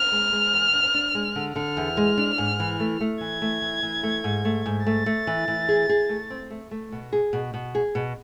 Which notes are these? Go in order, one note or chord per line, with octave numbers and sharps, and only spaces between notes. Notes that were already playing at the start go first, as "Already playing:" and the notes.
Already playing: F6
G#3
G#3
E2
D4
D4
G#3
D3
D3 F6
E2
G#3
D4
G#2
E3
A3
A3
E3 G#6
A3
E3
E3
A3
G#2
A3
G#2
A3 A6
A3
E3
E3
G#4
G#4
A3
C4
A3
A3
B2
G#4
B2
B2
G#4
B2